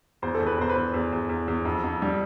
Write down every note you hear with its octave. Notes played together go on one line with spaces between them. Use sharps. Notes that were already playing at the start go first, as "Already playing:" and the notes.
E2 C5
A4
E2
B4
E2 C5
B4
E2
E2
E2
E2
E2
F2
F2
G3